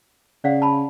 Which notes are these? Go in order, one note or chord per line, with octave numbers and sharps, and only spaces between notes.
C#3 D5 F5 F#5
A5 B5